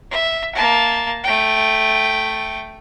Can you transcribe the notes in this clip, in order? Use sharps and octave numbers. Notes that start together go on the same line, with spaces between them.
E5
A#3 A5
A3 G5